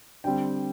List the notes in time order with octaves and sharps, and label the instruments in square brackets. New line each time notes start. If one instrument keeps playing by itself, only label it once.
[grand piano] D3 G3 C4 G5